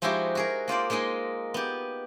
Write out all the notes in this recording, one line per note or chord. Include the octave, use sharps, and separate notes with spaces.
F3 G#3 D#4 E4 F#4 G4
F#4 G#4 A#4
A#3 F4 C5 D5
G#3 A#3 D#4 D#5 G#5
B3 G4